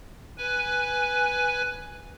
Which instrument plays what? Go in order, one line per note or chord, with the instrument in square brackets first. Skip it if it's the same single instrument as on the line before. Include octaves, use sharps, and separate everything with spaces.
[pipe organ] B4 G#5